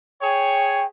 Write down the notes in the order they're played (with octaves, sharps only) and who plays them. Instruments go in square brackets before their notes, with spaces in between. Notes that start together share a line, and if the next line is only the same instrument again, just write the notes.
[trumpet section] G#4 C#5 [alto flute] G5